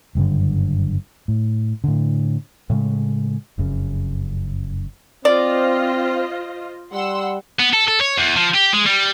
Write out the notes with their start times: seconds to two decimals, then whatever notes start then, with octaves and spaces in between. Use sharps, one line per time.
0.15 F#1 G2 A#2 D3
1.28 A2
1.84 A2 D3
2.70 A2 C#3 G#3
3.58 F1 F#2 C#3
5.25 C4 F4 C5 D5 D#5
6.93 G3 F#5 C6 E6
7.60 B3
7.74 A4
7.88 A4
8.01 C#5
8.17 E2
8.36 F3
8.54 G4
8.73 G#3
8.86 G3